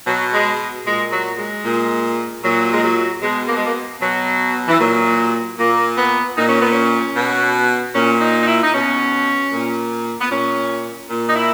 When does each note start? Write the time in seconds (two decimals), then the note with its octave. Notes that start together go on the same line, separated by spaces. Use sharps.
0.07 B2 F#3
0.33 G#3
0.86 A#2 G#3
1.12 F#3
1.39 G#3
1.65 A#2
2.43 A#2 F#3
2.73 G#3
2.83 F#3
3.22 B2 G#3
3.48 A#3
3.57 G#3
3.65 A#3
4.00 B2 F#3
4.68 E3
4.79 A#2 F#3
5.59 A#2 A#3
5.98 B3
6.37 A#2 D#4
6.49 C#4
6.61 B3
6.73 C#4
7.16 B2
7.95 A#2 C#4
8.22 D#4
8.41 D#4
8.48 E4
8.63 D#4
8.73 B2 C#4
9.52 A#2
10.21 B3
10.31 A#2 C#4
11.10 A#2
11.28 D#4
11.36 E4